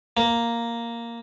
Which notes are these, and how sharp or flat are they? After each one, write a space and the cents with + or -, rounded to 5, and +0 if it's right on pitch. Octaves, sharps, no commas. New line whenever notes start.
A#3 +0